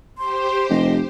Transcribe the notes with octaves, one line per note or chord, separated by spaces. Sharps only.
G4 C5 C6
F1 D#5